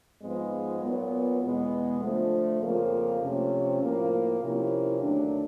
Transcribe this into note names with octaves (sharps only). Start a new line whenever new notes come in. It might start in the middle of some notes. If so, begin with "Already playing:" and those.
G#2 F3 G#3 B3
A#2 F#3 B3
E2 B2 G#3 B3
D3 F3 A3
F2 C#3 F3 A#3
C3 F3 A3 C#4
A2 F3 A#3
C3 F3 A#3 C#4 E4
D#2 D3 F#3 A3 D4